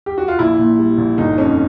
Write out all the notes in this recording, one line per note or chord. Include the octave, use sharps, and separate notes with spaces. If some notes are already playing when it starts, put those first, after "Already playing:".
G4
F#4
F4
A#1 E4
A#2
G3
A#1
G1 D#4
F2 C#4